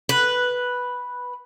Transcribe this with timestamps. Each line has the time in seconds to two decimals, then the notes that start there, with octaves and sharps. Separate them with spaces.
0.09 B4